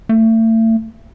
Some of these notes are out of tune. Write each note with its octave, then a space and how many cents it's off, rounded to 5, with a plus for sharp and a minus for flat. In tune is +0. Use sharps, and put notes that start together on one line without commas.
A3 +35